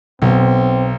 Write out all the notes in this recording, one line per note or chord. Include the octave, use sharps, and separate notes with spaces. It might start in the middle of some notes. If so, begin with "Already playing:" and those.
B1 B2 C4